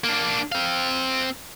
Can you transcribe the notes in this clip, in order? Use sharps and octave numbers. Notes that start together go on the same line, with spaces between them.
A#3 D4
C4 F5